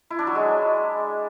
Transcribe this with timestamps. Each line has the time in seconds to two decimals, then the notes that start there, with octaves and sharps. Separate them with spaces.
0.10 E4
0.19 D4
0.27 F#3
0.35 G#3